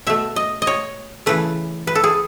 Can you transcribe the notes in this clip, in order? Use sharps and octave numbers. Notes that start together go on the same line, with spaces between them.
B2 A3 E5
D#5
D#5
C#5
C#3 E3 A3 B4
B4
A4
G#4